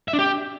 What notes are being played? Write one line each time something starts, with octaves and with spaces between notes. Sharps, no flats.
E5
D4
G4